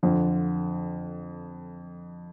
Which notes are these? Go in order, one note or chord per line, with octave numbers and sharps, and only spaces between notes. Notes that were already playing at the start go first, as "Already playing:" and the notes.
F2 D3 F3